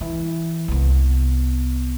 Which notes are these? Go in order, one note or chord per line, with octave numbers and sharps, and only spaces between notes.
E3
C2 B3